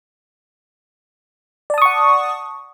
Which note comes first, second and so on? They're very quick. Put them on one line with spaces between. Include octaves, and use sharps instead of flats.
D5 A5 D#6 C#6 F#5